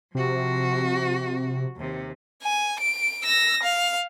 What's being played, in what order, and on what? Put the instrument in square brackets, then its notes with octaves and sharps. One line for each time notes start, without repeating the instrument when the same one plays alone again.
[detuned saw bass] C3 [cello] F3 F#4
[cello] D#2 C3
[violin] G#5
D7
E6 A#6
F5